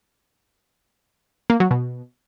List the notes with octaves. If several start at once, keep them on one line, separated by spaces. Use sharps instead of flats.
A#3
F#3
B2